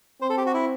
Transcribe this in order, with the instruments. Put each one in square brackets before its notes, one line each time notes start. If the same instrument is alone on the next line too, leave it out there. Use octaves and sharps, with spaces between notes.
[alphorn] C4 [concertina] C5
[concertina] A4
G4
F#4
E4